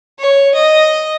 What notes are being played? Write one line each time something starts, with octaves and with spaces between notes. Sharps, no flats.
C#5
D#5